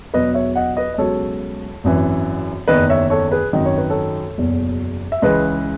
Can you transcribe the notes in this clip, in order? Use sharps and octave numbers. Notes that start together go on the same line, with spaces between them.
E1 E2 B2 F#3 B4 D#5
C#5 E5
D#5 F#5
B4 D#5
D#5
C#2 B2 F#3 A4 C#5
G#1 F#2 E3
F#1 E2 D#3 B4 D#5
C#5 E5
A4 C#5
G#4 B4
G#1 F#2 D#3 D#5
C#5
B4
A4 C#5
F#1 E2 B2 F#3
E5
C#2 C#3 E3 B4 D#5